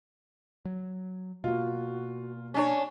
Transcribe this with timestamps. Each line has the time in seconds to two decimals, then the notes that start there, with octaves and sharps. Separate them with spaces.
0.65 F#3
1.44 B2 A#3 F4 F#4
2.54 C#4 D4 C#5 G#5